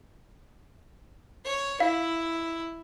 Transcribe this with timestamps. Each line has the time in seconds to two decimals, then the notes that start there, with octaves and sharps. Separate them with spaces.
1.45 C#5
1.80 E4 F5